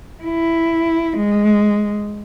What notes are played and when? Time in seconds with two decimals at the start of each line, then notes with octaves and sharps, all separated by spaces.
0.23 E4
1.17 G#3